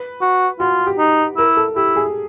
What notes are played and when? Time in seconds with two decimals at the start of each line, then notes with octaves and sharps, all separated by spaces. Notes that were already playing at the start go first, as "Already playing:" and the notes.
Already playing: B4
0.21 F#4
0.60 F4 F#4
0.87 G4
0.98 D#4
1.37 E4 A#4
1.57 A4
1.76 E4 G4
1.96 G#4